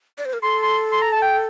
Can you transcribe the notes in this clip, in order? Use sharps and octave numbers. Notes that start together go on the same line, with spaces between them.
D5
C5
A#4
A4 C6
C6
C6
A#5
A5
G5